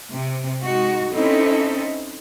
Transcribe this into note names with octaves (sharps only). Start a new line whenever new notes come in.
C3
G#3 D#4 F#4
C4 C#4 D#4 E4 A4